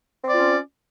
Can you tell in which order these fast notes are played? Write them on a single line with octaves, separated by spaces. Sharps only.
C4 D5 F4 C#4